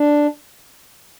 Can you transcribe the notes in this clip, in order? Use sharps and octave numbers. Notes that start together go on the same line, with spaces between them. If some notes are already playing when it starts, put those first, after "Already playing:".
Already playing: D4